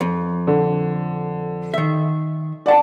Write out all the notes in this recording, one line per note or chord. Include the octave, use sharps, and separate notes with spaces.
F2
D3
D#3 E5
D5 F#5 A5